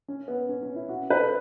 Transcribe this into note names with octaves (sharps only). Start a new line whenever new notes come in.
C#4
B3
C#4
C#4
E4
F#4
B4
A4